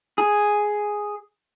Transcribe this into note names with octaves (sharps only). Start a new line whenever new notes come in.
G#4